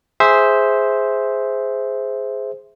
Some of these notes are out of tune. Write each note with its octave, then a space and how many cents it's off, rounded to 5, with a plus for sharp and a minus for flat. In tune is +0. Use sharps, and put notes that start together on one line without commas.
G#4 +0 C5 +0 E5 -10